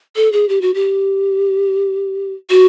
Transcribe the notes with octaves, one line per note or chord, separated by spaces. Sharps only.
A4
G#4
G4
F#4
G4
F#4